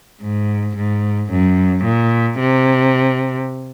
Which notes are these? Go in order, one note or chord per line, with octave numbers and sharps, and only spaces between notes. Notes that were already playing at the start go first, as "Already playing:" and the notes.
G#2
G#2
F#2
A#2
C3